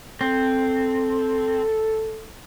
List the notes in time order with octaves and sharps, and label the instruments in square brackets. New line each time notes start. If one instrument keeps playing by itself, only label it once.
[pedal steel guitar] C4 [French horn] A4